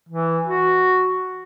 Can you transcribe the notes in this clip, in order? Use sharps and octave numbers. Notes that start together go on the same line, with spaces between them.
E3
F#4